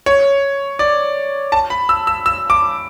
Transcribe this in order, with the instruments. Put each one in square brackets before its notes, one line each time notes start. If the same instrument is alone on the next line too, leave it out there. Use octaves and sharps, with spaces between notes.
[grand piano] C#5
D5
A5
B5
E6
E6
E6
D6